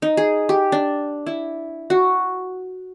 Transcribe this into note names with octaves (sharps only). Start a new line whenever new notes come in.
D#4
G#4
G4
D4
E4
F#4